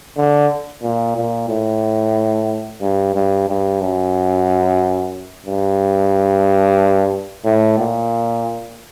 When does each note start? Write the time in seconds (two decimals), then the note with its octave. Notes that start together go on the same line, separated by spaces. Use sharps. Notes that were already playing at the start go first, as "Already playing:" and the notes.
0.17 D3
0.83 A#2
1.17 A#2
1.49 A2
2.82 G2
3.15 G2
3.48 G2
3.81 F#2
5.46 G2
7.45 A2
7.79 A#2